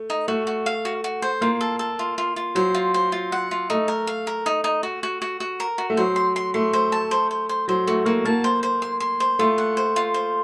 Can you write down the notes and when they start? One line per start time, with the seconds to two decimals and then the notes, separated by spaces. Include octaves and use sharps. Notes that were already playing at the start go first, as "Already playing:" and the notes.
Already playing: A3
0.10 D#4
0.28 A3 F#4
0.47 F#4
0.66 F5
0.85 F#4
1.04 F#4
1.22 C5
1.41 A#3 F4
1.61 A4
1.79 A4
1.99 F4
2.18 F4
2.36 F4
2.55 F#3 C5
2.75 F4
2.94 C5
3.12 F4
3.32 F#5
3.51 F4
3.70 A3 D#4
3.88 A#4
4.07 F5
4.27 A#4
4.46 D#4
4.64 D#4
4.83 F#4
5.03 F#4
5.22 F#4
5.40 F#4
5.60 A#4
5.78 F#4
5.90 A3
5.97 F#3 C5
6.16 C6
6.36 C6
6.54 A3 C6
6.73 C5
6.92 A5
7.11 C5
7.31 C5
7.49 C5
7.68 F#3 C5
7.87 A3 F#4
8.05 A#3 F#4
8.25 A#3 A5
8.44 C5
8.63 C5
8.82 C6
9.00 C6
9.20 C5
9.39 A3 F4
9.58 F#5
9.77 C5
9.96 F4
10.14 C5